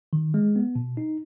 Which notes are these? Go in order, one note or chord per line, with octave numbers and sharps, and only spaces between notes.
D#3
G#3
B3
B2
D#4